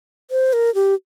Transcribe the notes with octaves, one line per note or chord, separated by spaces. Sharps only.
C5
A#4
G4